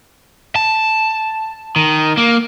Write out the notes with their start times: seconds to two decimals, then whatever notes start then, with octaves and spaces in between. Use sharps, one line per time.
0.56 A5
1.76 D#3
2.17 A#3